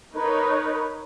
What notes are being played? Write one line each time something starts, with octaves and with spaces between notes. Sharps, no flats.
D#4 A#4 B4 C#5